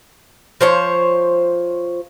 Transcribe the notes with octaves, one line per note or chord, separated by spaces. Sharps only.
F3 C5 C#5